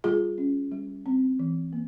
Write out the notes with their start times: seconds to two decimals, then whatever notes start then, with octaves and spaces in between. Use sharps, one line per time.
0.04 G3 F4 G#4
0.38 C#4
0.72 G3
1.06 C4
1.39 E3
1.73 A#3